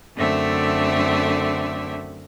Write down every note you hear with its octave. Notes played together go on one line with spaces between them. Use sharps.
F#2 D3 A3 C4 E5